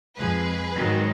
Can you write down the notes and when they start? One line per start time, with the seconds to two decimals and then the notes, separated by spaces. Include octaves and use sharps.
0.17 F2 F3 G#3 G#4 B4
0.74 G#2 D#3 F#3